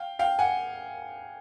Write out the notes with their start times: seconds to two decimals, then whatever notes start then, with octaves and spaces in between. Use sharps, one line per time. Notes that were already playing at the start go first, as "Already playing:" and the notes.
Already playing: F5 G5
0.19 F5 G5
0.39 F#5 G#5